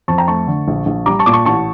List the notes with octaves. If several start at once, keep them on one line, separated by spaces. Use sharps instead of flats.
F2 A5 C#6
G5 A#5
A3 A5 C#6
D3
A#1
A#1
G3 A#5 D6
A5 C#6
A#2 D6
A5 C#6
A1 A5 C#6